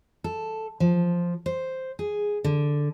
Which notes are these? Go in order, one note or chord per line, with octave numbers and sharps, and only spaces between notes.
A4
F3
C5
G#4
D3